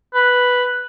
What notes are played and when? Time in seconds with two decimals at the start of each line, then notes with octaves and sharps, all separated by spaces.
0.15 B4